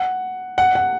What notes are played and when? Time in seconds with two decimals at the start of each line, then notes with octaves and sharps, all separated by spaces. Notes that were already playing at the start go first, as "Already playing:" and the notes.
Already playing: F#5
0.58 F#5
0.75 F#5